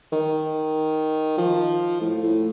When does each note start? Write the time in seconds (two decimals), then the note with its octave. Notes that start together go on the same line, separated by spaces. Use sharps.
0.13 D#3
1.38 F3
2.01 A2
2.23 A2